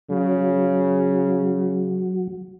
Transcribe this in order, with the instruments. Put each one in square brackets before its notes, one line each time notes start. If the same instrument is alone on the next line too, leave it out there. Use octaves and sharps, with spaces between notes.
[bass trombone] C#3 [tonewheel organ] F#3